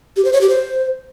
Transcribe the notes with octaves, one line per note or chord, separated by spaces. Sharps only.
G4
C5
C#5
G4
C5